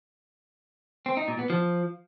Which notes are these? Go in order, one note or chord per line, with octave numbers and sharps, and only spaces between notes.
C4
D#4
A#2
B3
F3